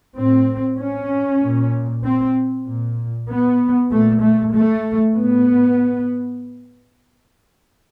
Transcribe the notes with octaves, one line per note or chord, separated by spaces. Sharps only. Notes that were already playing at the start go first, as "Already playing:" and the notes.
A2 C4
C#4
A#2
C4
A#2
B3
A#2 A3
A3
A3
A2 B3